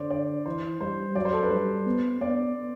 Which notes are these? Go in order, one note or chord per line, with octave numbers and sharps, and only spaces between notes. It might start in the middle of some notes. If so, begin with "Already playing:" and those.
Already playing: D3 C5 D5
D5
E3 C5
G3 C5
F#3 D5
C5
A4
B4
G3 C5
B3
B3 D5